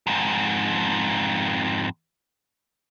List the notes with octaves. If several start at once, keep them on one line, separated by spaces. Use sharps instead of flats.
F2 G#2